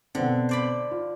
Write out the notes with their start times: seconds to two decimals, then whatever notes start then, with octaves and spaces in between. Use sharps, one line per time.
0.15 B2 D3 B3 C4
0.49 C5 D5 B5
0.91 F4